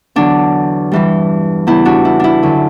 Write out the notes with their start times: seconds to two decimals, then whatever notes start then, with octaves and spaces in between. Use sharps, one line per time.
0.16 E2 D3 F#3 D4
0.92 G2 E3 G3
1.67 E2 C#3 G3 E4
1.85 D4 F#4
2.05 E4
2.20 D4 E4
2.42 F#2 D3 F#3